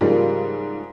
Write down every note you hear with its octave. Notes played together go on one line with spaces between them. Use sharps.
G#2 C#3 F3 G3 A#3